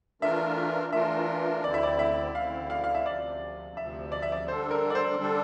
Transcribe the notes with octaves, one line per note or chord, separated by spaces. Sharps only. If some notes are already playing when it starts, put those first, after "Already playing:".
E3 A3 D4 F4 A#4 E5
E3 A3 D4 F4 A#4 E5
D2 D3 A3 C4 E4 D5
E5
D5
E5
D2 D3 A3 C4 E4 F5
F5
F5
E5
D2 C3 F3 D5
D2 C3 F3 E5
D5
E5
D5
D3 G3 D4 A4 C5
A#4
D5
C5
D3 G3 D4 A4